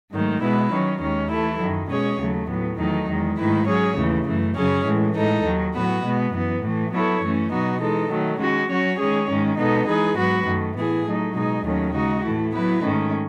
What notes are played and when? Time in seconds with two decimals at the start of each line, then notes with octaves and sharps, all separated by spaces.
0.12 G#2 D#3 F#3 A3
0.42 B2 G#3 B3 E4 B4
0.72 D#3 F#3 C#4
1.01 D#2 D#3 G#3 C#4
1.30 E3 A3 E4 A4
1.60 F#2 D#3 F#3
1.89 B2 G#3 C#4 G#4 C#5
2.20 D#2 C#3 F#3 A3
2.49 A2 F#3 B3
2.78 E2 D#3 F#3 A3 D#4
3.08 E2 D#3 G#3
3.38 G#2 D#3 A3 E4 B4
3.67 F#3 C#4 G#4 C#5
3.97 D#2 C#3 E3 A3
4.27 F#2 E3 A3
4.56 F#2 C#3 F#3 C#4 G#4
4.85 A2 E3 G#3
5.15 A2 G#3 D#4 A4
5.44 D#2 D#3 F#3
5.75 A2 F#3 B3 F#4 B4
6.03 B2 G#3 B3
6.33 F#2 E3 B3
6.63 A2 E3 A3
6.92 F#3 B3 E4 A4 C#5
7.22 F#2 E3 A3 C#4
7.51 B2 F#3 B3 D#4 F#4
7.81 E3 G#3 D#4 A4
8.10 D#3 F#3 A3
8.40 D#3 G#3 C#4 F#4
8.69 F#3 C#4 F#4 C#5
8.99 D#3 G#3 C#4 G#4 C#5
9.28 G#2 D#3 G#3 C#4
9.58 B2 G#3 B3 D#4 A4
9.88 E3 G#3 D#4 G#4 B4
10.17 G#2 F#3 B3 F#4 B4
10.47 F#2 D#3 A3
10.76 A2 E3 B3 E4 G#4
11.06 F#3 A3 D#4
11.35 B2 G#3 D#4 G#4
11.65 D#2 D#3 F#3 A3 C#4
11.94 C#3 G#3 D#4 F#4
12.24 A2 E3 A3 E4
12.53 F#3 B3 E4 B4
12.83 G#2 D#3 A3 C#4